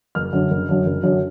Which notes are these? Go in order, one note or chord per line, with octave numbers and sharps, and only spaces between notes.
F#1 F6
F#2 D3 F#3
F#1
F#2 D3 F#3
F#1
F#2 D3 F#3